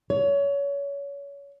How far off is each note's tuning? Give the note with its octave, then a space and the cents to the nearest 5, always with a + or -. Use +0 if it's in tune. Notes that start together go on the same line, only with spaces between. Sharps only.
C#5 +25